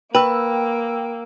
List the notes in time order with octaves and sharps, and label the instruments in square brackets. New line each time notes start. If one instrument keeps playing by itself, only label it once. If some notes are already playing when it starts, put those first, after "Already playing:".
[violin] A#3 [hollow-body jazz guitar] B4 [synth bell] G5 E6